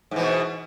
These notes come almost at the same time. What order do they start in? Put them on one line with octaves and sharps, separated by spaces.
G#2 E3 B2